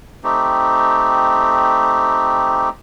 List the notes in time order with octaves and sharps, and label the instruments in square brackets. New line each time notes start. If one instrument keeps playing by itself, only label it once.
[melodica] A3 C4 D#4 G4